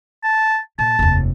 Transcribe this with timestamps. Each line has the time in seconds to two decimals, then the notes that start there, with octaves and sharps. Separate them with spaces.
0.24 A5
0.79 A#2 A5
0.99 F1 D#2